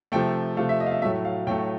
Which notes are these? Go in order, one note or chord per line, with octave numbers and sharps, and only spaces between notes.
C3 F3 A3 G5
C3 F3 A3 F5
E5
D#5
F5
E5
A2 F#3 A3 E5
F5
A2 F#3 A3 G5